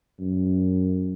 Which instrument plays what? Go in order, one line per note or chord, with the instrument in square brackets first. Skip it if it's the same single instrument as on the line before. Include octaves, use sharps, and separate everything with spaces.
[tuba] F#2